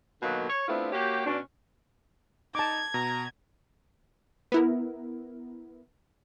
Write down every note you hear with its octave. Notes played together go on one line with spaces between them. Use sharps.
B2 D3 D#3 F#3 A#3
C#5
A3 B3 C4 D4 E4 F4
A#3 C#4 F#4 G4
B2 C#4 D4
D#4 A5 D6 G#6
B2 A#5
B3 E4 A#4